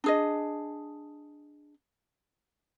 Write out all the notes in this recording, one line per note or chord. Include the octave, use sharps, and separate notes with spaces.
D4 G#4 D#5